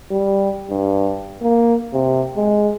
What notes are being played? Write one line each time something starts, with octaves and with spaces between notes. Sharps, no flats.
G3
G2
A#3
C3
G#3